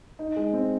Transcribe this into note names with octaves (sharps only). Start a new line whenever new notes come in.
D#4
G#3
C4